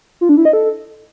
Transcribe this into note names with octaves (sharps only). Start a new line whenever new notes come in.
F4
D4
E4
D#5
A4